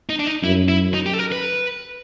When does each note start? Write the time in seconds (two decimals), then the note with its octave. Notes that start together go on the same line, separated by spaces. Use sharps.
0.09 D#4
0.19 D4
0.27 D#4
0.43 F#2 E4
0.69 E4
0.94 D#4
1.06 G4
1.13 A4
1.19 A#4
1.32 B4